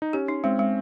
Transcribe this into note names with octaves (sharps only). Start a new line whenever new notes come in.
D#4
C#4 G4
D#4
G#3 C4
G#3